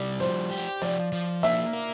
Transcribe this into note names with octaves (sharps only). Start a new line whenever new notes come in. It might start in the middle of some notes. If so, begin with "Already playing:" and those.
Already playing: C3 G3 D5
F3 C5
G4
F3 D5
F3
A#3 E5
A#4